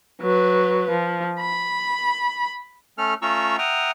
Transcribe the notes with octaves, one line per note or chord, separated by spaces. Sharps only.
F#3 B4
F3
B5
A3 C#4 A4 F6
A3 C#4 F4 A#5 C#6 E6
E5 F#5 G5 A#5 D#6 F6